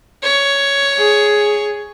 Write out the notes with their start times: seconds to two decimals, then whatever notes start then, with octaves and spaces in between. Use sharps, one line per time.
0.23 C#5
0.97 G#4